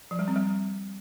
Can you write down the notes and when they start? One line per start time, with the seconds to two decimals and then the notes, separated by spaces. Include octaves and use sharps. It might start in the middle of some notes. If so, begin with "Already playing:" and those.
0.11 F3
0.19 G3
0.28 C4
0.36 G3